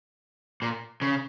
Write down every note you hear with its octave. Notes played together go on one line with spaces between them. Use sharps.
A#2
C#3